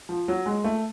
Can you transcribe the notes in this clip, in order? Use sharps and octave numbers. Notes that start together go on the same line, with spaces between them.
F3
F#3
G#3
A3